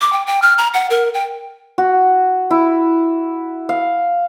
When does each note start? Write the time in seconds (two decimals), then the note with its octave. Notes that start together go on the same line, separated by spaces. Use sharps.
0.01 D6
0.13 G5
0.27 G5
0.42 F6
0.58 A#5
0.74 F#5
0.90 A#4
1.14 G5
1.78 F#4
2.51 E4
3.69 F5